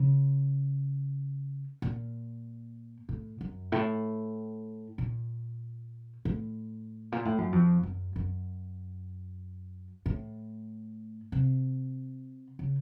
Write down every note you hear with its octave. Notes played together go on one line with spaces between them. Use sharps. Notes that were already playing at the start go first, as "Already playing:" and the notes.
Already playing: C#3
A#2
A2
F#2
A2
A#2
A2
A#2
A2
F#2
F2
F#2
F#2
A2
C3
C#3